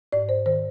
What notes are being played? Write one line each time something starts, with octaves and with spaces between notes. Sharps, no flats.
G#2 D5
C5
D#3 C5